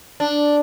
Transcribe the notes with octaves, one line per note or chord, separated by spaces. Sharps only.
D4